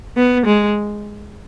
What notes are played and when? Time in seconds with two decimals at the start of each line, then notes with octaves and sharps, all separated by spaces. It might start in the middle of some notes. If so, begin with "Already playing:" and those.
0.17 B3
0.46 G#3